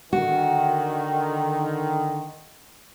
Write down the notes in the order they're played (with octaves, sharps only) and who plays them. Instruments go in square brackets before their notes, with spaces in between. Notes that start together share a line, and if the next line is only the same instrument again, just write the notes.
[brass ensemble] D3 D#3 [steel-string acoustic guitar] F#4